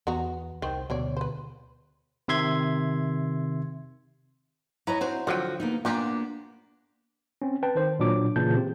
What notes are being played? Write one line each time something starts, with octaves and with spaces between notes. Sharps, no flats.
E2 B3 F#4 A#5
C2 D#3 C5
D2 B2 F#3 C#5 D5
B4 C5
C3 D#3 E5 C6 G#6
C#4 E4 B4 C#5 D#5 A#5
F#3 C4 F#4 C5
D3 F3 F#3 F#4 C5 G5
A#3 B3 D#4
A#2 A#3 B3 D4 F4 G4 F#5 A#5
C4 C#4
B4 G5 A5
D#3 C5
A#2 F#3 D4 D6
A#2 C#3 E3 A5 G6
C4 G4